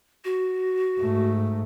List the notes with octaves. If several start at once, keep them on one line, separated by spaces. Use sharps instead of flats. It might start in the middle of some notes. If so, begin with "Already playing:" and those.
F#4
G#2 A3